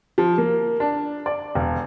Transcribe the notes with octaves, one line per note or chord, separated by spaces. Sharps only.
F3
A#3
D4
D5
E1